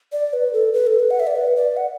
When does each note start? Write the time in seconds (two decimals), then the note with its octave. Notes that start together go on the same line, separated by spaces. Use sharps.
0.12 D5
0.33 B4
0.53 A4
0.73 B4
0.87 A4
0.99 B4
1.11 F#5
1.20 E5
1.27 D5
1.35 B4
1.56 D5
1.77 F#5